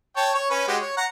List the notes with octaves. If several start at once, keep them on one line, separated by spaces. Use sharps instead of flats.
C#5 G5 A5
C#5
C#4 B4 G#5
G#3 F#4 G4
C#5
F#5 A#5